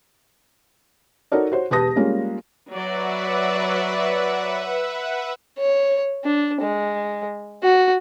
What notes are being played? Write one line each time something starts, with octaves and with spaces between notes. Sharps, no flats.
D#4 F#4 A4 A#4 C#5 D5
F#4 C5 C#5
E1 G4 B4 A5 D#6 A#6
G3 G#3 A#3 C#4 F4
F#3 B4 D5 E5 F#5
C#5
D4
G#3
F#4